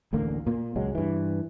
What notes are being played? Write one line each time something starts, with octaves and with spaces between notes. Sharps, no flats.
A1 D2 D3 A#3
A#2 A#3
C#2 F#3 G#3
G2 E3